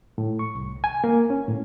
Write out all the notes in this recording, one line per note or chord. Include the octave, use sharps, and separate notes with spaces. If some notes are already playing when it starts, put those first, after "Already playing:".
A2
C#6
C2
G#5
A#3
C#4
A2